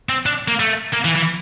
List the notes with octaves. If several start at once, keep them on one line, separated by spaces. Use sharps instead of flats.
C4
D4
A#3
A3
A#3
E3
E3